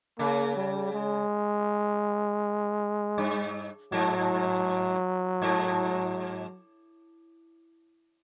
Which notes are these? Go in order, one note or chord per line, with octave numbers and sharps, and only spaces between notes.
C#3 A#3
G3
G#3
G2
G#2 F#3
G#2